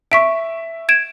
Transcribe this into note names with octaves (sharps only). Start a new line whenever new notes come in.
E5 C#6 B6 D7
G#6 D7 E7